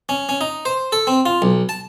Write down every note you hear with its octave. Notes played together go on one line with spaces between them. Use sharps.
C#4
C#4
D#4
C5
A4
C4
F4
B1
A5